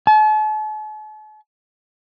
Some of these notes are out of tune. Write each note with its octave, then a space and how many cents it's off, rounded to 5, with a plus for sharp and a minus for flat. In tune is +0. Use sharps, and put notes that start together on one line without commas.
A5 -45